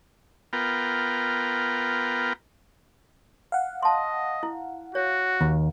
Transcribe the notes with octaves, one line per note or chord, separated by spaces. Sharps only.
B3 F4 A#4 G5
F5 F#5
D#5 A5 C6
E4
F#4 C#5
D#2